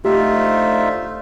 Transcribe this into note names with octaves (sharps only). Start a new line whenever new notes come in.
D3 F3 A3 D#4 F4 G4 E5